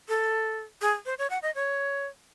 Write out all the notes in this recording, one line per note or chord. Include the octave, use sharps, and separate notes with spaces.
A4
G#4
C5
C#5
F#5
D#5
C#5